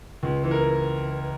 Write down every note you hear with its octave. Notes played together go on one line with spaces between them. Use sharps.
C#2
E3
A#4